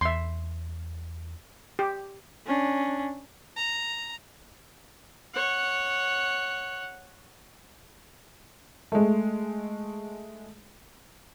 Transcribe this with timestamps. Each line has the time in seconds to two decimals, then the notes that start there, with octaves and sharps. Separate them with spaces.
0.01 E2 E5 C6
1.79 G4
2.47 C#4 D4
3.56 A#5
5.34 C#5 F#5
8.92 G#3 A3